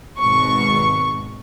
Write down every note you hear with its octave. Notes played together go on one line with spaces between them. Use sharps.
G#1 B2 C#6